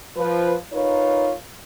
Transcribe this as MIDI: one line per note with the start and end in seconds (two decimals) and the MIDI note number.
0.16 0.54 53
0.16 0.54 71
0.72 1.31 63
0.72 1.31 65
0.72 1.31 70
0.72 1.31 71
0.72 1.31 73